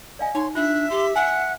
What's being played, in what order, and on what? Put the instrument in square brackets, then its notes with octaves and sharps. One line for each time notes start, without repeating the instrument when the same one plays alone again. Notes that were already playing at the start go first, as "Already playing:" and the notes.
[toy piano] D5 F5 G#5 [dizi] D#5
[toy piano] D#4 [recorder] C#5 [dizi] C6
[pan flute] D4 [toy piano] F4 [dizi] E5 [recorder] F#6
[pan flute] G4 [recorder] C6
[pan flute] F#5 [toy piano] G#5 [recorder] F#6